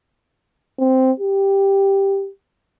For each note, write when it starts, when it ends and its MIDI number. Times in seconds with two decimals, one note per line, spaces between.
0.79 1.12 60
1.20 2.30 67